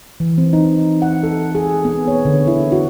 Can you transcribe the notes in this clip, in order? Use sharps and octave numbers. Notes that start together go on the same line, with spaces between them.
E3
C4
D#4
F#5
A4
G#4
B3
C#5
D3
E4
F#4